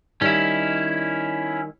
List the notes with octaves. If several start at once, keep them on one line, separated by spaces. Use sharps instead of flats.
D#3 G3 C#4 D#4 E4